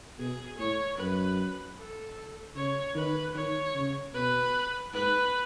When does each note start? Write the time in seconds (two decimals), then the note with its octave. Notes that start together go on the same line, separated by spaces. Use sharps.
0.19 B2 G#4
0.58 A2 C#5
0.97 F#2 B4
1.77 A4
2.55 C#3 C#5
2.95 D#3 B4
3.35 D#3 C#5
3.75 C#3
4.14 B2 B4
4.93 G#2 B4